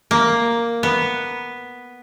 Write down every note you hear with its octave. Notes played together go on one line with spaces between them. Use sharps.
A#3
B3